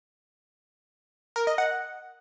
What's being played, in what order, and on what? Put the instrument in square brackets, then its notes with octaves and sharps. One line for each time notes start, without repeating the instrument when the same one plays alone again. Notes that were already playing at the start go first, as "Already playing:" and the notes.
[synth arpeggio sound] A#4
D#5
F#5